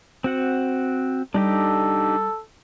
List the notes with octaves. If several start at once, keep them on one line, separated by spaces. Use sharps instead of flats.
C4 F#4 F#5
G3 D4 D#4 G4 A4